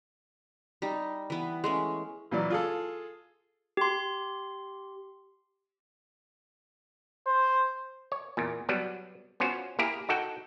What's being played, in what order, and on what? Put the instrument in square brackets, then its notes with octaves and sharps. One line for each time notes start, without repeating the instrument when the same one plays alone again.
[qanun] G3 D#4
E3 B3
G#3 A3 C#4
[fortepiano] A#2 E3 F#3 D5
F4 G#4 A4
[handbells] G4 C6
[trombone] C5
[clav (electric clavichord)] C#5
E2 A#2
F#3 G3 B3
B3 C#4 F4 F#4 C5
A#3 E4 G4 G#4 A#4
D#4 F#4 A4 F#5 G5